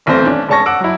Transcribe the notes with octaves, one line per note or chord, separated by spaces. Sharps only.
D#1 B1 E3 A3 C4 C5
C#4 D4
F1 G#3 C#5 A5 C#6 A#6
F#5 D6 E6 D7
F#3 E4